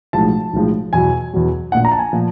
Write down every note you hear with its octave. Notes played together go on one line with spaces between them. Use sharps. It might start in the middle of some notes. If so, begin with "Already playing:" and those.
B1 A2 F3 G#3 A5
B1 A2 F3 G#3
E2 B2 F#3 G#5
E2 B2 F#3
A#1 A#2 F3 F#5
A#5
A5
G#5
A#2 F3